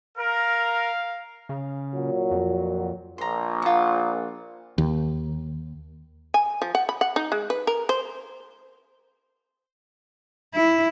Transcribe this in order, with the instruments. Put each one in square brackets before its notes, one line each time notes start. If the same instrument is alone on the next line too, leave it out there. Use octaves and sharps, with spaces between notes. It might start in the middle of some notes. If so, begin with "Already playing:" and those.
[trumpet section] A#4 [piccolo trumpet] F5
[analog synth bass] C#3
[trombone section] A#2 F#3
[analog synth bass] F2
[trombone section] A#1 A#2 [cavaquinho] A#5 C6
[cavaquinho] F4 F#5
[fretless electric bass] D#2
[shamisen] G#5
F3
F#5
B5
F#5
D#4
G#3
B4
A#4
C5
[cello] E4